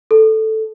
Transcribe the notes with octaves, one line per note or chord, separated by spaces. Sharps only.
A4